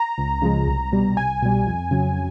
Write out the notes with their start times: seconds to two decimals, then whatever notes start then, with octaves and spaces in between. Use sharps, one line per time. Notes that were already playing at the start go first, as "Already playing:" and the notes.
Already playing: A#5
0.18 C#2
0.42 C#3 F3 G#3
0.67 C2
0.92 B2 G3
1.17 C2 G#5
1.42 B2 G3
1.67 F2
1.91 C#3 F#3